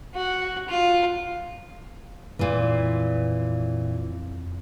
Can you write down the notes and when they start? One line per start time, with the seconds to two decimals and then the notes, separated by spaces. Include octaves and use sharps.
0.15 F#4
0.69 F4
2.39 F2 A#2 E3